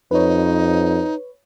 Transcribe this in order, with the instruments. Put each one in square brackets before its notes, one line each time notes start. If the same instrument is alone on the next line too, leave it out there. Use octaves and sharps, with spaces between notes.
[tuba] F2 [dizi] D#4 [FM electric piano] B4 C#5